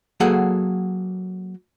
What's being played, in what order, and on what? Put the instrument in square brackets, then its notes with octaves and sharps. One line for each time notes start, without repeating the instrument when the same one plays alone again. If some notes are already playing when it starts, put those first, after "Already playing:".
[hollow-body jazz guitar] F#3 A#3 G#4 A4 F#5